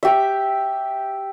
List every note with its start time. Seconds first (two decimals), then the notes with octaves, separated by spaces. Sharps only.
0.03 G4 E5